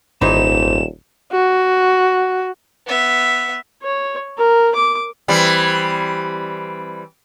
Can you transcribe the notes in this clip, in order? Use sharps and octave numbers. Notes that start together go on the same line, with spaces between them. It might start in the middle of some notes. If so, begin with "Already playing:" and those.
D#1 G#1 G#2 E3 D#4 C5 E7
F#4
B3 E5
C#5
A#4
D6
E3 G3 C4